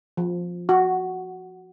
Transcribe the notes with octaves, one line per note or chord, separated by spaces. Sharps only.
F3
F#4